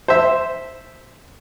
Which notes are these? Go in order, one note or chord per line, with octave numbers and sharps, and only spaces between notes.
C5 E5